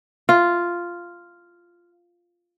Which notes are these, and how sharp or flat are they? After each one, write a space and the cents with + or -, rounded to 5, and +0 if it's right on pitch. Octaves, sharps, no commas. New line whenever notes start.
F4 -5